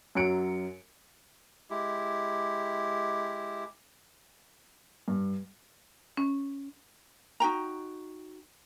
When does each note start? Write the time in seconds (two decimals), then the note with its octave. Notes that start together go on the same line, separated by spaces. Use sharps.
0.15 F#2 F#3 C#7 D7
1.70 G#3 E4 G4
5.08 G2
6.17 C#4
7.40 D#4 F#4 G5 A#5